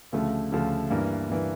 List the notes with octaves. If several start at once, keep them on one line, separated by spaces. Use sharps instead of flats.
D2 C#3 F3 A3
D2 C#3 F3 A3
G2 E3 A#3
G2 E3 A#3